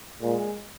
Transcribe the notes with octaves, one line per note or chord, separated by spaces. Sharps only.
A#2 G#3